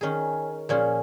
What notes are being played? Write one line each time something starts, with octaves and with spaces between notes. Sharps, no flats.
D#3 C#4 G#4
A#2 F3 C#4 G#4